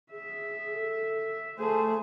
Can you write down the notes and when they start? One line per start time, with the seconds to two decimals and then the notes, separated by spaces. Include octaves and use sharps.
0.12 G#4 E5
0.73 A4
1.58 A3 G#4 C5